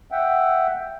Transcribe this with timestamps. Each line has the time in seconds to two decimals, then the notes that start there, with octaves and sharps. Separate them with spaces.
0.12 E5 F#5 G5